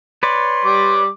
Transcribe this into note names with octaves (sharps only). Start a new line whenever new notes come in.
B4 C#5 D5 C6
G3 D6